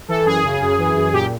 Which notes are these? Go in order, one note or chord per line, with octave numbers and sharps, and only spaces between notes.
E3 A4
F#2 G#4
C#3
F#2
E3
F#2
A#2 G4